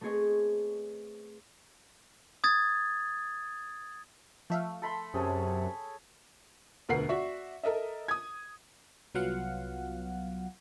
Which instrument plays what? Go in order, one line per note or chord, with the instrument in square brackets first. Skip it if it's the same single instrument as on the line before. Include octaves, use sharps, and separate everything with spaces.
[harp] A3 B3 C4 G#4 C#5 D#5
[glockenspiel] D#6 G#6 A6
[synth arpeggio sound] F3 E5 F5 [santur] A3
[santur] A4 B5 C6
[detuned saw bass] F#2 [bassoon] C3 [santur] G#4 A4 C#5
[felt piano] E1 D2 A#4 B4 F#5 C7
F#4 D5 E5 C#6
A4 A#4 D#5 E5
D#6 G#6
[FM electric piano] C2 F#3 B3 F4 F5 F#5